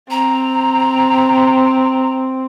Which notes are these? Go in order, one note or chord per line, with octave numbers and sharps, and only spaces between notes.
C4 A#5